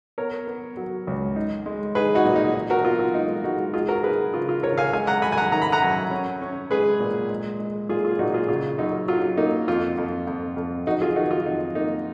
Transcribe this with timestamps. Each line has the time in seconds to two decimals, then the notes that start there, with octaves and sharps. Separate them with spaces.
0.18 B3 A#4 C#5
0.47 B3
0.77 F#3
1.07 C#2
1.36 D#4
1.66 G#3
1.95 D#4 G#4 B4
2.15 D#4 F#4
2.25 A#2
2.36 D#4
2.55 D#4
2.70 F#4 A#4
2.85 B3 F4
2.99 F4
3.14 G#3 D#4
3.44 G#3 D#4 F#4
3.74 D#4 F4 G#4
3.89 F#4 A#4
4.03 D#4 G#4 B4
4.33 C#3 F4
4.49 F4
4.63 C#3 A#4 C#5
4.78 F5 G#5
4.93 G#3 F5 G#5
5.07 F#5 A#5
5.22 F#2 G#5 B5
5.32 G#5
5.37 F#5 A#5
5.52 D#3 A#5
5.62 B5
5.72 F#5 A#5
5.82 F#2
6.11 C#4
6.42 C#4
6.71 G#3 G#4 B4
7.00 A#2
7.30 G#3
7.60 G#3
7.89 A#2 F4 G#4
8.05 F4
8.19 A#2 D#4 F#4
8.34 F4 G#4
8.49 C#3 F4
8.78 F#2 D#4
9.08 F#3 F4
9.37 A#3 D#4
9.68 F2 F4
9.98 F2
10.27 F2
10.57 F2
10.87 F2 D#4 F#4
11.01 F4 G#4
11.16 D#3 D#4 F#4
11.31 F4
11.46 F2 D#4
11.75 A#3 D#4